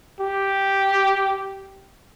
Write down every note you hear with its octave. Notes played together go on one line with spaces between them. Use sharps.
G4